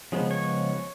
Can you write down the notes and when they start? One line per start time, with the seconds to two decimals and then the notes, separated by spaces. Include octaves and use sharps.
0.12 C#3 F3 G#3 B3
0.31 C#5